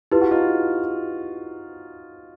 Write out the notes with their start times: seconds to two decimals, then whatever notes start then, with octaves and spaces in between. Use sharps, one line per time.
0.12 E4 F4 G4 B4
0.21 F#4
0.31 D#4 F4